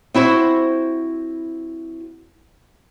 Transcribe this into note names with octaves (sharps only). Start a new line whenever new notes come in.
C4 E4 F#4 C5